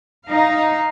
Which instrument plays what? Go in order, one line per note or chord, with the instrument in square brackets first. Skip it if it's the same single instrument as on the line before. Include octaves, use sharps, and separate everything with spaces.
[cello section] D#4 F5